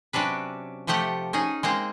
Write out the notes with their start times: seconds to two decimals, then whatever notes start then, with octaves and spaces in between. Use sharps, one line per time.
0.13 C3 F#3 C#4 D4 B4
0.87 C3 F3 A3 G4 F#5
1.33 C#4 D#4 G#4
1.63 G#3 A#3 C4